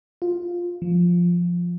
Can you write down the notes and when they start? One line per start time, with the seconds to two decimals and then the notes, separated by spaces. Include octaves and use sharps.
0.22 F4
0.82 F3